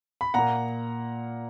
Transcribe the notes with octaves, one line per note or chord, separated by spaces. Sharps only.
B5
A#2 A#3 F#5 A#5